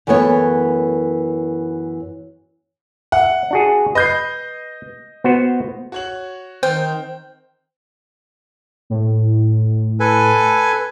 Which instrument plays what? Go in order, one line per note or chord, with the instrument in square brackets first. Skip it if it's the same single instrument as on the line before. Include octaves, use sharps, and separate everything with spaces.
[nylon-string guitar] F#2 E3 A3 B3 A4 C#5
[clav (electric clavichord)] E5 [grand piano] F#5
[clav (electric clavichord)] D4 F#4 G#4
[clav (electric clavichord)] B4 [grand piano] D#5 G6 C7
[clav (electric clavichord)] B3 F#4 C5
[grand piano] F#4 C#5 F#7
[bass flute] D#3 [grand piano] C4 F6 G6 [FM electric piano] C5 [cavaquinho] G5
[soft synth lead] A2
[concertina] A4 B4 G#5